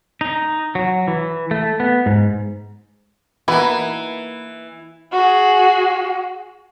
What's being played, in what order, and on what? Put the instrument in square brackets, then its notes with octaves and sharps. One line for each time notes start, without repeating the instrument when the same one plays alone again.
[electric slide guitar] D#4
F#3
E3
A3
B3
G#2
[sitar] E3 [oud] A#3 D#4 [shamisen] B3 F#4 B4 [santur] E4
[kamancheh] F#4 G#4